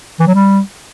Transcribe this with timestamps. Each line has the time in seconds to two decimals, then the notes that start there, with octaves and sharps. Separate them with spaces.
0.20 E3
0.27 F#3
0.35 G3